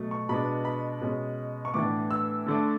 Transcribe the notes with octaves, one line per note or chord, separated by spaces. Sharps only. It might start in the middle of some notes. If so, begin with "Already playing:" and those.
Already playing: B2 F#3 A3
C#6
B2 G#3 B3 D4 B5
B5
B2 G#3 C#4
C#6
A2 E3 B3 D4 D6
E6
D3 A3 D4